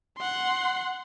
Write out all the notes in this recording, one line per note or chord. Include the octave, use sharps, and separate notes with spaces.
F#5 C6